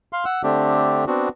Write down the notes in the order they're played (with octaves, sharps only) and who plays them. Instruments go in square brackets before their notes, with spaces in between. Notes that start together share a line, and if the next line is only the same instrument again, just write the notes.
[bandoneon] F5 C6
F#5 E6
D3 A3 C4 D4 G4
B3 C4 D4 F#4